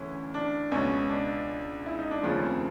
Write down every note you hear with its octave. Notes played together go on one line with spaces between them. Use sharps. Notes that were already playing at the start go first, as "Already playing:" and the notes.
Already playing: D2 C#3 E3 C#4
D4
C#2 B2 C#4
D4
E4
D#4
D4
F1 D#2 C#3 F3 C#4
C4